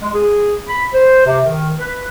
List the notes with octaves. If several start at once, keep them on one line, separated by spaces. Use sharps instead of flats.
G#3
G#4
B5
C5
C3
D#3
B4